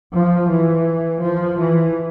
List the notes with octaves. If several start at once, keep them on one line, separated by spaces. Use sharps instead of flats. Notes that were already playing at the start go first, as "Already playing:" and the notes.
F3
E3
F3
E3